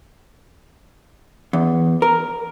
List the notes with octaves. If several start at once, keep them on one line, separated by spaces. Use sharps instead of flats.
E2
A#4